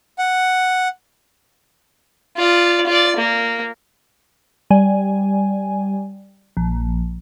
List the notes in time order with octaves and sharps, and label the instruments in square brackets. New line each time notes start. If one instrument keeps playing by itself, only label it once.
[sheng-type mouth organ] F#5
[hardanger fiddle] F4 D5
F4 D5
A#3
[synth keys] G3 G#5
A#1